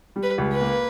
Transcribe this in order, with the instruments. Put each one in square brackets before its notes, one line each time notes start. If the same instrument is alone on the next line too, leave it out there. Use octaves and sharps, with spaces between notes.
[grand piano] G3
[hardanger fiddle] B4
[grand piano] C#2
[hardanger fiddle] B4
[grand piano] A#3